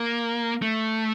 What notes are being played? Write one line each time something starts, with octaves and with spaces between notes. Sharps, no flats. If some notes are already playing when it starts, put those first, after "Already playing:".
Already playing: A#3
A3